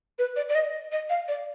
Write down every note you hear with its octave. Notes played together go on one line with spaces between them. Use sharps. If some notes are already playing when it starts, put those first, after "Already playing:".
B4
D5
D5
D#5
D#5
F5
D5